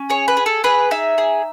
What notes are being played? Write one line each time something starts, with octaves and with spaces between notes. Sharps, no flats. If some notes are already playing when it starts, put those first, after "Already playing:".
Already playing: C#4
G#4 C#5
B4
G#4
A4
G#4 B4
D#4 E5
G#4